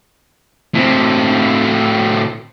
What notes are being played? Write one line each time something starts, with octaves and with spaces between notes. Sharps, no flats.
A2 C4